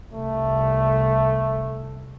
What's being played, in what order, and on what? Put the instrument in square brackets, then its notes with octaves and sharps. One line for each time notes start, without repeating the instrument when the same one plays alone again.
[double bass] C2 [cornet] A3